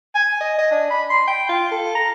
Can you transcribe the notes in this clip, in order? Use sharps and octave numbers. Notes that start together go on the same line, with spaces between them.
G#5
D#5
D#5
D4
B5
C6
G5
F4
A4
A#5